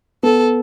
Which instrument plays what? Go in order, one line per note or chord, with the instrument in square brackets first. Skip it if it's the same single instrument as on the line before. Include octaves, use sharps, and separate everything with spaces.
[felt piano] B3 [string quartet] A4